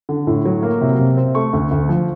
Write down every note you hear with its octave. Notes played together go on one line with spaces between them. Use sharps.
D3
A2
F#3
A#3
C3
C3
C4
A3 C#6
D2
D2
F3